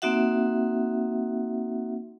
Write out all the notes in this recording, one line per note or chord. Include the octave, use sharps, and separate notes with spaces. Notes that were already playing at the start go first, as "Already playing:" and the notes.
A#3 C4 D#4 F#4 E5 F#5